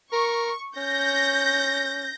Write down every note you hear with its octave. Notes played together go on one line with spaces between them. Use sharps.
A#4 C#6
C#4 G6 A#6